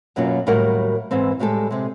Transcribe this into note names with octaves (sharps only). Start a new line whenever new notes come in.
F#2 B2 F#3 A#3 C#4 F4
D#2 A2 F#3 G3 A#4 F#5
E2 G#2 E3 C4
A2 G3 G#3 G4 A4
C3 G#3